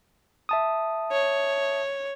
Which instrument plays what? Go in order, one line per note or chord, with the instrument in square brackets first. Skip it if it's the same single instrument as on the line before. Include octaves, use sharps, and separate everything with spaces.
[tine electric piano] E5 A5 D#6
[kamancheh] C#5